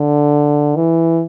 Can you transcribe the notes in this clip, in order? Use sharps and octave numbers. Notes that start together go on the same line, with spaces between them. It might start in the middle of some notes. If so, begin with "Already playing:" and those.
Already playing: D3
E3